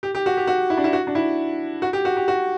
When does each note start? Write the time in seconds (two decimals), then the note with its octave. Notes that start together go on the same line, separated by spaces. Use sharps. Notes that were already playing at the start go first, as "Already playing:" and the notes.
0.03 G4
0.15 G4
0.26 F#4
0.37 G4
0.47 F#4
0.70 E4
0.78 D4
0.84 E4
0.93 F#4
1.07 D4
1.15 E4
1.82 F#4
1.93 G4
2.05 F#4
2.17 G4
2.28 F#4